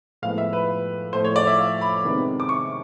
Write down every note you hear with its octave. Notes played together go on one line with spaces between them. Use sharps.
A2 F3 G#3 B3 F5
E5
B4
A2 F3 A3 C5
C#5
D5
E5
F5
B5
C3 D#3 G#3 B3
D6
C#6